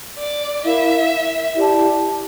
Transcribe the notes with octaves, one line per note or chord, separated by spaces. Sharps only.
D5
E4 A#4 E5 F5
E4 G4 D5 A5